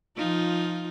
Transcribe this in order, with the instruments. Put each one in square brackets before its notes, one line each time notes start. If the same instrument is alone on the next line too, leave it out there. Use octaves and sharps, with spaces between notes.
[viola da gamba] F3 D#4 F4